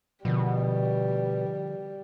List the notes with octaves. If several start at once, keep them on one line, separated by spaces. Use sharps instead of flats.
B2 D3 F3 G3